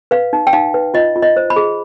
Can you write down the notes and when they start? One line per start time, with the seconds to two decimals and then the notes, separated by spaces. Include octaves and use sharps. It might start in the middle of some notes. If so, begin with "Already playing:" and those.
0.11 B4 F5
0.33 D#4
0.47 G5
0.53 D#4 F5
0.74 B4
0.94 F4 D#5
1.16 F4
1.22 D#5
1.37 C5
1.50 B5
1.56 G#4